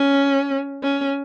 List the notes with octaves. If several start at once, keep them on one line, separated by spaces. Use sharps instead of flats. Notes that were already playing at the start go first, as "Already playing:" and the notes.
Already playing: C#4
C#4